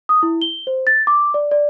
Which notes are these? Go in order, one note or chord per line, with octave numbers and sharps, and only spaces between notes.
D#6
E4
G7
C5
A6
D6
D5
D5